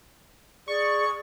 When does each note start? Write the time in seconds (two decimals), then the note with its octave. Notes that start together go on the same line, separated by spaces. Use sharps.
0.68 G#4 D5 C#6